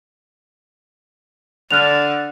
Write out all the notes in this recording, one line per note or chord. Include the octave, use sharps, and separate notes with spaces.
D3 F6 F#6 F7